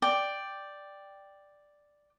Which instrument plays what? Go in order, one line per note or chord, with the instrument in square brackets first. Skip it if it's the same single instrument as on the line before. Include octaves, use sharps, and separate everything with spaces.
[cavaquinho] D5 G5